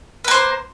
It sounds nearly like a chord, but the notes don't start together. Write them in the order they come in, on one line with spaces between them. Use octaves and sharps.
B4 A#3 C5